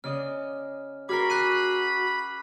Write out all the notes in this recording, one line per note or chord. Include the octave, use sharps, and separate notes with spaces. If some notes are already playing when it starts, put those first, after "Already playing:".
C#3 D5 D#5 F6
F#4 G#4 A#4 B5 D6 F6 C7
F#6 C7 D#7